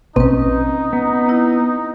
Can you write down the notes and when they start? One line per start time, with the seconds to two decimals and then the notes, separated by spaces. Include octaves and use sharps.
0.16 A#1 B2 C4 C#4 D#4 B4
0.93 B3
1.29 E4